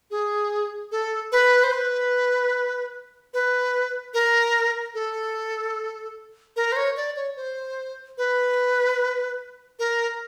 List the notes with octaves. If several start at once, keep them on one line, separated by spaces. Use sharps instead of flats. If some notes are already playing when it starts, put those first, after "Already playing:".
G#4
A4
B4
C5
B4
B4
A#4
A4
A#4
C5
C#5
D5
C#5
C5
B4
A#4